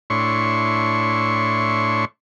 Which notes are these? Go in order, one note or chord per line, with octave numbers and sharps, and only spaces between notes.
A2 D4 E4 C#5 C6 C#6